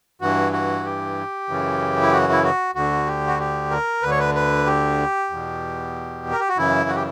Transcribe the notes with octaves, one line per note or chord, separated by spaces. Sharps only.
G2 E3 F#4
F#4
G4
F#2 C#3 E3
E4
F#4
E4
F#4
D2 D3 F#4
G4
F#4
G4
A#4
D2 D3 B4
C#5
B4
B4
G4
E2 B2
A#4
G4
F#4
F#2 C#3 E3 E4
F#4
G4